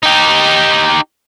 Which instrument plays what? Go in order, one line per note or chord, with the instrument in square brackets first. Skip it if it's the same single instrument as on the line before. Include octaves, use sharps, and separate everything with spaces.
[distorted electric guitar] D#4 G4